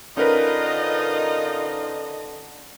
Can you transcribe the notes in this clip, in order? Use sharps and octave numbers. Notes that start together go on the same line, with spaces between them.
D3 C#4 D#4 F4 A#4 B4 D#5